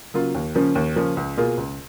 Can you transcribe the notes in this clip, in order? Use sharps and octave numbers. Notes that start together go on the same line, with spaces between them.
C#3 F#3 A#3 F4
D#2
C#3 F3 A#3 C#4
D#2
C#3 F3 A#3 C#4
C#2
B2 A#3 F4 G#4
C#2